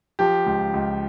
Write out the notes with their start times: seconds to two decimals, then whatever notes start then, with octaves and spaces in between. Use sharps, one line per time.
0.19 F3 G4
0.46 C#2
0.74 C#2